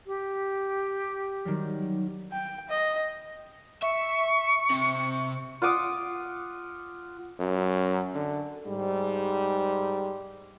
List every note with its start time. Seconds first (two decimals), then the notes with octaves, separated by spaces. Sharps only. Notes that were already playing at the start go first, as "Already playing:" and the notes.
0.07 G4
1.45 D#3 F#3 G3
2.32 G5
2.69 D#5
3.82 E5 C#6
4.70 C3
5.62 F4 F#5 D6 D#6
7.40 F#2
8.15 D3
8.67 G#2 G3